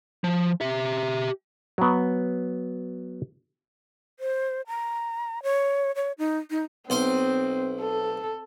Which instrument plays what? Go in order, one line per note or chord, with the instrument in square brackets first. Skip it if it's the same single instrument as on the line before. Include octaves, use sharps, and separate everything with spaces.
[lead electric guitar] F3
G4 E5
[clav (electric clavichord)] F#3 B3
[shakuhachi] C5
A#5
C#5
C#5
D#4
D#4
[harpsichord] B1 C5 C6 [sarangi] C4
[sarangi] A4